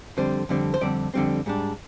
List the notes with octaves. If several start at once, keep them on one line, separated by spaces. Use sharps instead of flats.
F2 D3 G3 C4 C5
F2 D3 G3 C4
C5
F2 D3 G3 C4 D5
F2 D3 G3 C4
G#2 G3 D4